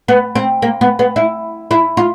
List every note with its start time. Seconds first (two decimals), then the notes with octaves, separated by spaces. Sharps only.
0.08 B3
0.35 C4
0.62 A#3
0.81 B3
0.99 B3
1.16 E4
1.71 E4
1.97 F4